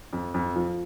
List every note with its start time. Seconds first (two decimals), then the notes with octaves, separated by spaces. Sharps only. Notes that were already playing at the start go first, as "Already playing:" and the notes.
0.13 F2
0.34 F2
0.56 F3